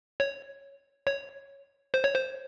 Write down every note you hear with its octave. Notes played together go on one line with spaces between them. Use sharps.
C#5
C#5
C5
C#5
C5